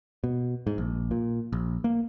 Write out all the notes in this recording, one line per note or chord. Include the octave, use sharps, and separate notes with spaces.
B2
G#2
A#1
A#2
A#1
A#3